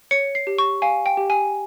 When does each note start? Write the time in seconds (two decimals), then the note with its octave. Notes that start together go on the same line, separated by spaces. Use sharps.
0.11 C#5 C#7
0.35 C7
0.47 G4
0.58 C#6
0.82 F5 G#5
1.06 G5
1.17 G4
1.30 G#5